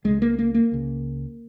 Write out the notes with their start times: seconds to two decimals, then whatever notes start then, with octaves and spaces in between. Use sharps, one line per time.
0.04 C#2 C#3 G#3
0.22 A#3
0.39 A#3
0.54 A#3
0.72 C#2 C#3